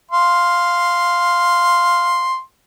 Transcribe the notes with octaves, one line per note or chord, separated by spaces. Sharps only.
F5 C6